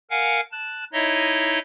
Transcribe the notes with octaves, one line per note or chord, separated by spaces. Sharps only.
A#4 F5 F#5 G#5
A5 F#6
D#4 E4 C#5 D#5 E5